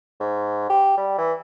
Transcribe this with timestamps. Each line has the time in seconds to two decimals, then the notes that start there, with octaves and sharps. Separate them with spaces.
0.20 G#2
0.69 G4
0.97 G3
1.18 E3